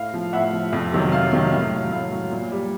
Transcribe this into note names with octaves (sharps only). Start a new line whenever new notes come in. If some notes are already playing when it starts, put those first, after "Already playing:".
Already playing: A2 F5
F3
A2 E5 F#5
F3
F2
C3 D#3 F#3
F2 F5
C3 D#3 F#3
A2 F5
F#3
A2 F5
F#3
A#2
G3